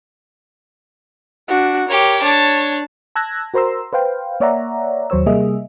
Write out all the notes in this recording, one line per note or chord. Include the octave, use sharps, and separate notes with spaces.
D4 F#4
G4 A#4 C#5 D6
D4 C#5 A5
A5 E6 F#6 G#6 A#6
F#4 A#4 C5 A#5 C6 E6
B4 C5 F5 G5
A#3 C#5 D5 E5 F#5 A#5
D#2 F#3 C5 C#5 E6
C3 G3 A#3 G#4 D#5 E5